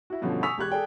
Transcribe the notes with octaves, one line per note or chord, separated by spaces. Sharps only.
E4 F#4
G2 B2 D3 F3 C#4
G#5 C#6 D#6 E6 B6 F7
E1 G4 C#6 F#6 G#6
G#4 A4 D5 G5